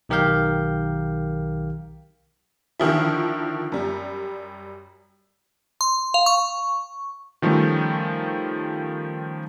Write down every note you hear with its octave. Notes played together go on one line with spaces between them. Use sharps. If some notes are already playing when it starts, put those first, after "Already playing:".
B1 D#3 G4 A#4 F5 G6
D3 D#3 F3 E4
F#2 G3
C6
F5
C#6
D#3 F3 G3 A3 C#4